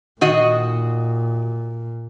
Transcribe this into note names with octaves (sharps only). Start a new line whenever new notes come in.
A#2 D#3 F#4 D#5